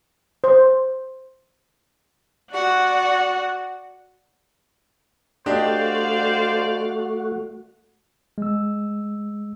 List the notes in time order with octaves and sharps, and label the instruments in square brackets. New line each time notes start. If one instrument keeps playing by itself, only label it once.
[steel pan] C5
[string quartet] F#4 D5 F#5
[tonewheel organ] A3 F#4 [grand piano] D4 G4 D#5 [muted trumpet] C5 [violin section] D5 F5
[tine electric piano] G#3 E6